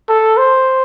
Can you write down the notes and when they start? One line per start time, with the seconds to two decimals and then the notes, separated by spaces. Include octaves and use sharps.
0.09 A4
0.38 C5